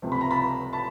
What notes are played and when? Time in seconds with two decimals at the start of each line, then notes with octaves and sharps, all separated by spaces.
0.02 C#2 C3 F3 A3 C4
0.12 B5
0.21 A#5
0.30 A5 B5
0.73 A5 B5